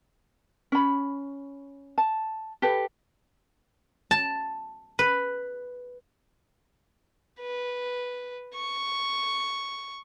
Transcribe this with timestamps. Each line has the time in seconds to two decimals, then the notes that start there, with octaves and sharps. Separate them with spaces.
0.72 C#4 B5
1.98 A5
2.62 G4 A4 B4
4.11 A5
4.99 B4
7.40 B4
8.55 C#6